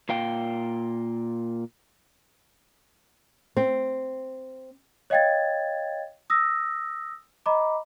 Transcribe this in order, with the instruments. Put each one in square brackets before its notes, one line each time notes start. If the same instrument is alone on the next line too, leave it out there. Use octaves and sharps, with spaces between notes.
[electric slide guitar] A#2 F5 G5
[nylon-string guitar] C4
[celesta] C#5 D#5 F5 G5 G#6 A6
D#6 E6 A#6
D#5 A#5 B5 D6